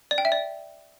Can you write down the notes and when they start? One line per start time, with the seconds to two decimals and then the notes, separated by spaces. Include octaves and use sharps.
0.11 D5
0.18 G5
0.25 E5
0.32 D5